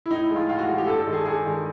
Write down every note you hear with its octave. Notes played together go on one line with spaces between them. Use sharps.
E4
A2 D#4
E4
F3 G#3
F4
A2 F4
F#4
F3 G#3
G4
G2 A4
A4
D#3 G#3
G#4
G2 G#4
D#3 G#3